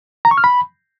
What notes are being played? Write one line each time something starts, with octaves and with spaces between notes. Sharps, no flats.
A#5
C#6
F6
B5